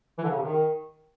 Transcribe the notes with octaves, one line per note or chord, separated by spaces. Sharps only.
E3
D3
C#3
C3
D#3